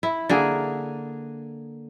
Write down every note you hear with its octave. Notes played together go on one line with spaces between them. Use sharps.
E4
D3 A#3 G#4